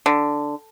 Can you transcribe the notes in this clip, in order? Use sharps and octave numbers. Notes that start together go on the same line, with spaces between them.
D3